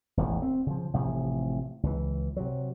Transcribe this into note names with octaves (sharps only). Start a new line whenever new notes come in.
E1 A1 D#2
C4
C#3 F3
A1 C3 F3 A3
C#2 E3
C3 F#3